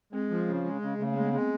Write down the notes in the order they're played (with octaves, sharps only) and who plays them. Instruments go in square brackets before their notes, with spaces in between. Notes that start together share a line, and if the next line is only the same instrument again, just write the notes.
[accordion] G#3 [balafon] C4
[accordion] F3
C#3
G#3
C#3
[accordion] C#3 [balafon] A3
[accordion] G#3 [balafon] A#3
[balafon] B3
[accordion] G#3 [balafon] C4